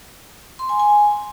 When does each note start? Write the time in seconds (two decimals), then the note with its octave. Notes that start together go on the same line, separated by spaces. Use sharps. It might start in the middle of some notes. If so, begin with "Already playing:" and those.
0.59 C6
0.69 G#5
0.80 G#5